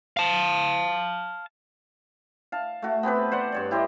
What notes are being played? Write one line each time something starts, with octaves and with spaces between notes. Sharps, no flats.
F5 A5
F5 A5
A3 F#4
B3 C4 G4 B4
C5 D5 F#5
G2 C#5 D5
E4 G4 C5 D#5